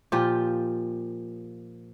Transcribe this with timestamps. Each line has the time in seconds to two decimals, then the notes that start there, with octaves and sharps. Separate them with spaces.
0.12 A#2 F3 F4 G4